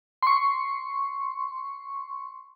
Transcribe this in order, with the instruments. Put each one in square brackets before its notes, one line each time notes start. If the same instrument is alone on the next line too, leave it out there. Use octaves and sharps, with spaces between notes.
[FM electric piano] C6 C#6